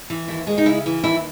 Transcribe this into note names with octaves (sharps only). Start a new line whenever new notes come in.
E3
D#2 E4
G#3
D#4
C#3 E4
E3
D#2 E4